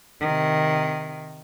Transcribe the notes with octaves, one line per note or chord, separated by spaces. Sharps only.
C3 D#3